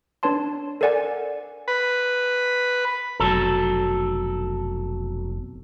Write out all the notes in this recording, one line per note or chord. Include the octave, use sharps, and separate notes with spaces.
D4 B4 C#5 A5 C6
A4 A#4 C5 D5 F#5 G#5
B4
F1 B1 F#3 A4